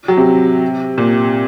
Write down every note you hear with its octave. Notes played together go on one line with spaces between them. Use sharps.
F#3
C3
A#2